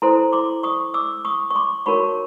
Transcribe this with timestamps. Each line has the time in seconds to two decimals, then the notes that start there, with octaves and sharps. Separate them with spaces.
0.02 E4 A4 C5 A#5 C6
0.33 C6 D6
0.63 C#6 D#6
0.94 D6 E6
1.25 C#6 D#6
1.51 C#6
1.56 C6 D6
1.86 D#4 F#4 A#4 C#5 B5 C#6